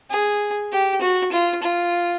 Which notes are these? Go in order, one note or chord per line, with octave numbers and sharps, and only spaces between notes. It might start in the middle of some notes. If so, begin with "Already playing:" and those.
G#4
G4
F#4
F4
F4